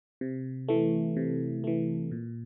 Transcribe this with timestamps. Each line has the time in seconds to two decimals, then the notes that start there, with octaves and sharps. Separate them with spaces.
0.21 C3
0.68 E3 A3
1.17 C3
1.64 E3 A3
2.11 A#2